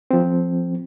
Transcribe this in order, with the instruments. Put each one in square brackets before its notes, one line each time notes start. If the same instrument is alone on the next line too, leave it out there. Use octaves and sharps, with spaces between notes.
[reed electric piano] F3 C4